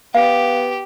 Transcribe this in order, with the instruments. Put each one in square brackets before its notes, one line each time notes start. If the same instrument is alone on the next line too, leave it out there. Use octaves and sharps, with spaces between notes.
[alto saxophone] B3 [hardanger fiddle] G4 [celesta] F5